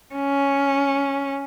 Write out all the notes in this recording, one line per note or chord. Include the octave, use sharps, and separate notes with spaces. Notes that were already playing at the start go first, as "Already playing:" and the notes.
C#4